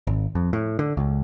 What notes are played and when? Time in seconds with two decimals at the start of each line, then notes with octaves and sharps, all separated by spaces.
0.07 G#1
0.35 F2
0.53 A2
0.79 D3
0.97 C#2